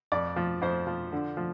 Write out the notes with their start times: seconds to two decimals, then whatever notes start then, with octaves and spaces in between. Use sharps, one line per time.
0.12 F2 D5
0.36 F3
0.62 F2 C5
0.87 F3
1.12 D3
1.37 F3